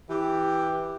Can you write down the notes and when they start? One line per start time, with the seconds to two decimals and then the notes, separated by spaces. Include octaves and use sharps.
0.10 E3 G4